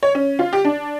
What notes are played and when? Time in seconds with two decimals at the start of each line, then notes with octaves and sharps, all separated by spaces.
0.03 C#5
0.15 C#4
0.39 F4
0.53 G4
0.65 D4